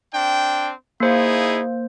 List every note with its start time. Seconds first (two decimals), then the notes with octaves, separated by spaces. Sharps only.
0.13 C4 D4 G5
1.00 A#3 D#4 E4 G#4 C5